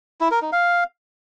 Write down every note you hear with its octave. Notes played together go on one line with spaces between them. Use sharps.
E4
A#4
D#4
F5